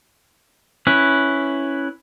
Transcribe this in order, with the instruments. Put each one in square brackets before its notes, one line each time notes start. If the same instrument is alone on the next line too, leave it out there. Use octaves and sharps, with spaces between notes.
[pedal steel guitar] C#4 E4 B4